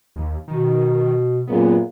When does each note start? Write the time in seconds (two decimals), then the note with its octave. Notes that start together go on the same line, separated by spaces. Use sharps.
0.16 D#2
0.48 B2 D#3
1.47 F#2 A#2 B3 G#4